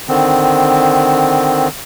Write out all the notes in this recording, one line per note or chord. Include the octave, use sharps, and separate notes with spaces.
D3 D#3 C4